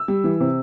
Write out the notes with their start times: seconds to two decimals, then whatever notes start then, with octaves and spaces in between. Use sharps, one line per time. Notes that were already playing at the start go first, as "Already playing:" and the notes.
Already playing: E6
0.08 G3
0.24 E3
0.40 C3